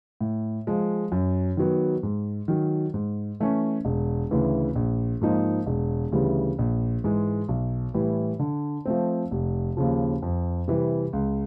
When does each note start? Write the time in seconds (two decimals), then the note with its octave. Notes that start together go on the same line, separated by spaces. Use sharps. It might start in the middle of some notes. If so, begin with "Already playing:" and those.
0.21 A2
0.67 F3 G#3
1.12 F#2
1.57 D#3 F#3 B3
2.03 G#2
2.48 D#3 F#3
2.94 G#2
3.40 E3 A3 C#4
3.85 E1
4.31 D2 C#3 E3
4.75 A#1
5.21 G#2 F3 A#3 D#4
5.67 E1
6.12 D2 C#3 E3 G3
6.59 A#1
7.04 G#2 E3 G#3
7.49 B1
7.94 A2 E3 G3
8.39 D3
8.85 F3 A3 C4
9.31 F1
9.77 D#2 C#3 F3
10.23 F2
10.68 C3 E3 G3
11.13 C#2